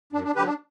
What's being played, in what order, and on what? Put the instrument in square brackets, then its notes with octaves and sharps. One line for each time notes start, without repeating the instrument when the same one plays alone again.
[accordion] F#2 D4
D4
D3 F#3 G4 B4
D4